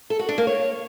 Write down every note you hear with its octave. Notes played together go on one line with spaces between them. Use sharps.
A4
F#4
D4
A#3
C#5